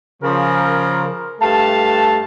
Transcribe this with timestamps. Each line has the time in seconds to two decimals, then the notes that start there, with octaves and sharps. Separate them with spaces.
0.23 C#3 F3 A#4
1.41 G2 A3 F5 A5